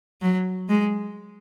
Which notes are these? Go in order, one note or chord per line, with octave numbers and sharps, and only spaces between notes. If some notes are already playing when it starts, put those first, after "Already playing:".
F#3
G#3